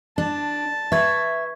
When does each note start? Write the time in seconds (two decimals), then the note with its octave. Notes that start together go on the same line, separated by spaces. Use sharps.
0.18 D4 A5
0.92 B4 E5 C#6 G#6